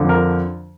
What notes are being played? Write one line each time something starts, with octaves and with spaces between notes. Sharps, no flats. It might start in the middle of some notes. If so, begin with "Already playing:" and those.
Already playing: F2 D3
A#4